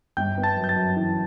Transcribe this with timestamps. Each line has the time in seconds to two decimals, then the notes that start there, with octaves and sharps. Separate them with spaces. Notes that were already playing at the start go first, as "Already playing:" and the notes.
0.17 G1 G5 G6
0.37 B3
0.43 A5 A6
0.57 F#2
0.64 G6
0.69 A5 A6
0.76 F#2
0.96 E3